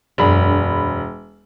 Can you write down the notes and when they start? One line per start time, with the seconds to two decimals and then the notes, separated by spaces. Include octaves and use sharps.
0.18 E1 F#2 D4 G#4 B5